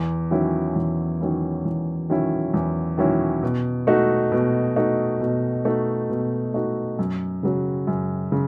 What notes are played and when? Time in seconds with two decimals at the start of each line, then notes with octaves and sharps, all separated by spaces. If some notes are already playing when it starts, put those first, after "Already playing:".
Already playing: E2
0.31 D#3 F#3 C#4 E4
0.76 E2
1.20 D#3 F#3 C#4 E4
1.65 E2
2.10 D#3 F#3 C#4 E4
2.54 E2
2.98 D#3 F#3 C#4 E4
3.43 B2
3.87 A3 D#4 F#4
4.32 B2
4.76 A3 D#4 F#4
5.21 B2
5.65 A3 D#4 F#4
6.10 B2
6.54 A3 D#4 F#4
6.99 F#2
7.43 C#3 F#3
7.87 F#2
8.32 C#3